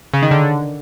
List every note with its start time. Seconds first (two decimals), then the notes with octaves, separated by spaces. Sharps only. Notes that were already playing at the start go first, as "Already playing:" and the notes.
0.14 C#3
0.22 D#3
0.31 D3